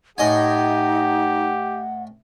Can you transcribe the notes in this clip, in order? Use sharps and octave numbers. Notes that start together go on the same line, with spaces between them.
A2 D#4 G4 D#5 F#5 G#5